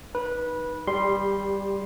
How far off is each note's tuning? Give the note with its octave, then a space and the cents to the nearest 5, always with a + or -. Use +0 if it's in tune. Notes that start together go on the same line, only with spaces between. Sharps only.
D#4 +0 B4 -20
G3 +0 G4 +25 C6 +0